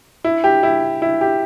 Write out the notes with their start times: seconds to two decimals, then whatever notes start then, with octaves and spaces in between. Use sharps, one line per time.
0.24 E4
0.44 G4
0.63 E4
1.02 E4
1.21 G4